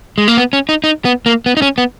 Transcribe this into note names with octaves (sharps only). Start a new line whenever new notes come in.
G#3
A#3
B3
C#4
D#4
D#4
B3
A#3
B3
D#4
C#4
B3